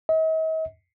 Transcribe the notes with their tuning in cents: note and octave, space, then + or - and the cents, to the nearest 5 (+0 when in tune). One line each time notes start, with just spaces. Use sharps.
D#5 +45